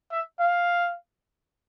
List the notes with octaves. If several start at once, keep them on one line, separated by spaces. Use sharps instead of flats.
E5
F5